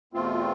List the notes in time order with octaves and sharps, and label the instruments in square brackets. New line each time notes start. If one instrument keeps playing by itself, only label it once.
[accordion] E2 B2 A3 C4 F4